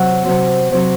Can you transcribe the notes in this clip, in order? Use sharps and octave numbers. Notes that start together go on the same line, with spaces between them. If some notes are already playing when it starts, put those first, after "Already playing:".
Already playing: C3 F#3 E5 F#5
C3 F#3 C4
C3 F#3 C4